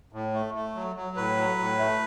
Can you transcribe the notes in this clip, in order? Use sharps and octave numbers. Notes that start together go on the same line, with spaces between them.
A2
A3
A3
F#3
F#3
A2 B4
F#3
A2
A3